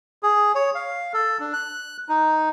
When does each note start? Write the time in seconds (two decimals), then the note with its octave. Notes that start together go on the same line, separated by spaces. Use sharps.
0.23 G#4
0.55 C#5
0.75 F5
1.14 A4
1.40 D4
1.53 F#6
2.09 D#4